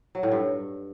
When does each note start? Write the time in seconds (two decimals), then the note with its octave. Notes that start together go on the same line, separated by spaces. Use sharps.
0.15 F#3
0.23 A2
0.32 G2